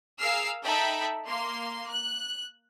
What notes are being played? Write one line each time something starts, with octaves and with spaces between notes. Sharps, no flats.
G#4 A#4 F5 E6 F6 C7
D#4 A4 E5 G5 B5
A#3 C6
F#6